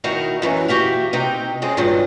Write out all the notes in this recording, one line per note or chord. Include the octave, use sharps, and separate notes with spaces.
D#2 D#3 D#4 E4 F#4 A#4
F#2 E3 F#3
F#4 G4 E5 F5
C3 D#4 G5
F#2 G#3 C4 G#4
G2 A#2 D#3 F#3